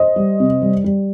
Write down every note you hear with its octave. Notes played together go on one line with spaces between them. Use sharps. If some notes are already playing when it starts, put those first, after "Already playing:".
Already playing: C5 D#5
G3
C3
G3
G3